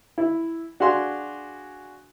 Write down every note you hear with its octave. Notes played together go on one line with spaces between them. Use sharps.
E4
D4 F#4 G#4 F5 G#5 C6